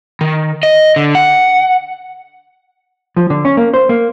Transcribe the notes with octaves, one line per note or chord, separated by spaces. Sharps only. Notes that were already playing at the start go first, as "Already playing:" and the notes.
D#3
D#5
D3
F#5
F3
D3
C#4
A#3
C5
A#3